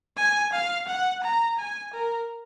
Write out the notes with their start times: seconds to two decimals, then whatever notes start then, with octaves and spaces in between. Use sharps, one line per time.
0.17 G#5
0.52 F5
0.88 F#5
1.23 A#5
1.58 G#5
1.93 A#4